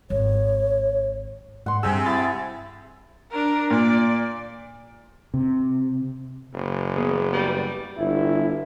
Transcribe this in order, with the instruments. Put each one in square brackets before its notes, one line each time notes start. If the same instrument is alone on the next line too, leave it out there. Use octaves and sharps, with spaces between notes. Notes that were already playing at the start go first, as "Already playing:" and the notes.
[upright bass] G#1 [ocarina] C#5
[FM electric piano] G#2 [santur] F#5 C6
[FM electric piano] G2 E6 [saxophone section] C3 [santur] G#4 G#5
[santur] E4 [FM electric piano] A6
[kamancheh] D4 A#4
[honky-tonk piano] A#2 [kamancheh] D5
[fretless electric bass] C3
[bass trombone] F#1
[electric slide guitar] B3 G#4 B4
[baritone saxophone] G3 [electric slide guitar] B4
[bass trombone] G1 [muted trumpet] E4